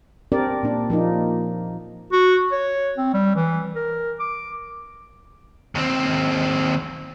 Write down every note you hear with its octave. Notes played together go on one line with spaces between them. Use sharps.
C4 D4 G4 A#4 D5
A#2 D4
F3 A#3 D#4
F#4
C#5
C4
G3
E3
A#4
D6
D#2 C4